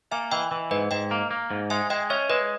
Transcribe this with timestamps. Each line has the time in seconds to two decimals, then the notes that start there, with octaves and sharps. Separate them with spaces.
0.11 A#3 E5 G#5
0.31 E3 D#5 G5
0.51 E3
0.71 G#2 B4 D#5
0.91 G#2 D#5 G5
1.11 A#3
1.31 A#3
1.51 G#2
1.70 G#3 E5 G#5
1.90 G#3 D#5 G5
2.10 C#4 C#5 E5
2.30 G#3 B4 D#5